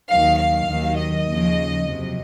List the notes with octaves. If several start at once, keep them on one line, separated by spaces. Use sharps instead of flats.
D#2 D#3 F#3 F5
F5
D#2 D#3 F#3
D#5
D#2 C#3 F3
F2 C3 F#3